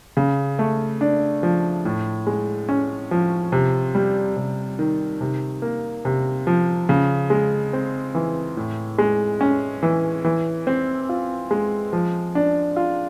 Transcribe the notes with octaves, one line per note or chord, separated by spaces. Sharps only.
C#3
A3
D4
F3
A2
G#3
C#4
F3
C3
G3
C3
D#3
C3
A#3
C3
F3
C#3
G#3
C4
E3
A2
G#3
C#4
E3
E3
C4
F4
G#3
F3
D4
F4